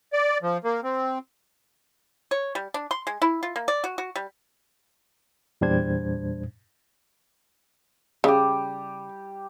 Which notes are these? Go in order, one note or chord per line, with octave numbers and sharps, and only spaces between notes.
D5
F3
A#3
C4
C#5
G3
D4
C6
G#3
E4
F4
A#3
D5
F#4
F#4
G3
E2 A#2 G3 D4 C5 G#6
C#3 G3 G4